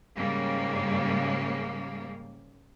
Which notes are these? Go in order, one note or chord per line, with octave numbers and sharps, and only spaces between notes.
G#2 C#3 G3 A#3